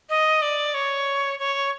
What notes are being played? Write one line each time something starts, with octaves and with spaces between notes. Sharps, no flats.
D#5
D5
C#5
C#5